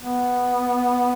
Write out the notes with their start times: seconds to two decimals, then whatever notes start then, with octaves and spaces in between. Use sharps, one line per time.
0.02 B3